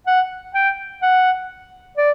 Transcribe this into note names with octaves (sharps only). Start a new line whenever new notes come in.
F#5
G5
F#5
D5